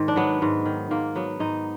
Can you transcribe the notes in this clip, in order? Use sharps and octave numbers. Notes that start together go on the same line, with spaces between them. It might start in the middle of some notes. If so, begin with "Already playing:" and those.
Already playing: G#2 D#3
D4
F#3 B3
G#2
D#3
G#2 A#3
F#3 B3
G#2 D#4